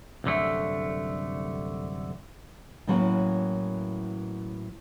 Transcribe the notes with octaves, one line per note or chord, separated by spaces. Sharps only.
C2 F#2 D3 A3
A2 E3 F#3 A#3 C#4